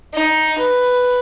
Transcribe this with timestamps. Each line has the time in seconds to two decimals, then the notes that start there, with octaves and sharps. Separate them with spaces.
0.14 D#4
0.58 B4